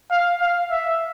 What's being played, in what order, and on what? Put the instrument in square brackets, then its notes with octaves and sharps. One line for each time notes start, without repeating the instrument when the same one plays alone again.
[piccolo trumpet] F5
F5
E5